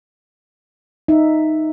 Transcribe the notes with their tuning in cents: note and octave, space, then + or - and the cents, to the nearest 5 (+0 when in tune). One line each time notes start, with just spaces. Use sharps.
D#4 +0 E5 +0